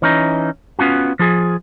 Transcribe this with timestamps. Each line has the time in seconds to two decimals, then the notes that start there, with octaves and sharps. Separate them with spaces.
0.02 E3 C#4 D#4
0.79 B3 C#4 F4 F#4
1.19 F3 F4 G#4